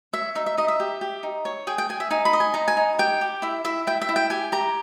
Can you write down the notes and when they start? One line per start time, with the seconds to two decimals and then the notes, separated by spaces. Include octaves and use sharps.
0.13 C#5 E5
0.35 D#4 E5
0.46 E5
0.57 D#4 D#5
0.68 E5
0.80 G4
1.01 G4
1.23 D#4
1.45 C#5
1.67 G#4 G5
1.78 G5
1.89 G#4 G#5
2.00 E5
2.11 D#4 G#5
2.25 B5
2.33 D#5
2.40 G#5
2.54 D#4 A#5
2.68 G#5
2.77 D#4
2.99 G4 G5
3.21 G4
3.42 E4 E5
3.64 E4 E5
3.87 E4 G5
4.02 E5
4.09 E4
4.16 G5
4.30 G4 G#5
4.52 G4 A#5